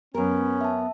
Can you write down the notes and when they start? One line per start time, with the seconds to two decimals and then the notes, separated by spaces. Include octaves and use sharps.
0.14 F#2 B3 C#4 A#4
0.61 E5 A5